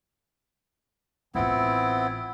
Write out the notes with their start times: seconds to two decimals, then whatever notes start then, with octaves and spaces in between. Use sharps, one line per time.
1.35 A1 B3 C4 E4 F4